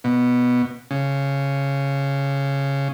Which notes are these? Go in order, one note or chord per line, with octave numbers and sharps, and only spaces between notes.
B2
C#3